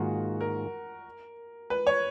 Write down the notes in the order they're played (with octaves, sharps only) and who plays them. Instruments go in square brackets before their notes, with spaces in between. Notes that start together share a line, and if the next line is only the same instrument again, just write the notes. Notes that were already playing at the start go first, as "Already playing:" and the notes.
Already playing: [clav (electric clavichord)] G#2 D#3 A#3 F4 G#4 [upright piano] F#4
[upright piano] A#4
B4
C#5